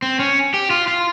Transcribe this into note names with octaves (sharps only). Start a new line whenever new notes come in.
C4
C#4
G4
F4
F4